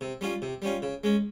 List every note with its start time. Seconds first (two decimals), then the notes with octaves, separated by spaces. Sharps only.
0.01 C3
0.21 G3 C#4 F4
0.42 C3
0.62 G3 C#4 F4
0.82 C#3
1.04 G#3 C#4